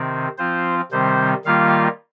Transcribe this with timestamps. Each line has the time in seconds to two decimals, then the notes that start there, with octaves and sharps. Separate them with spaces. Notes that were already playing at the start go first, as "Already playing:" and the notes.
Already playing: C3 D#3 C4
0.38 F3 C4 F4 C5
0.92 C3 D#3 G3 C4 C5
1.45 D#3 G3 A#3 F4 F5